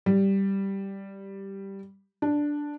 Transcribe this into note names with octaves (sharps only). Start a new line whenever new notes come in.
G3
D4